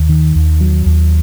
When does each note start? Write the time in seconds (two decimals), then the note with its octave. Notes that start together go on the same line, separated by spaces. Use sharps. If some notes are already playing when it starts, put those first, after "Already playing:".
Already playing: D#2
0.09 D#3
0.35 D#2
0.61 F#3
0.86 D#2